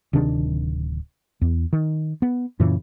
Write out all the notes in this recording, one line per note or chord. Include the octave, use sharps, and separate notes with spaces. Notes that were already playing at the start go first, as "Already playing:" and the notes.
D1 C3 D#3 D4
E2
D#3
B3
F#2 A#2 C#3 E3